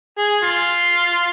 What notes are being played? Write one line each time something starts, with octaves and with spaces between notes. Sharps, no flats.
G#4
F4